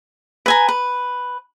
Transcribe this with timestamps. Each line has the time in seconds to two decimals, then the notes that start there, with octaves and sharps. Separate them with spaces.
0.46 B4 G#5 A#5
0.69 B4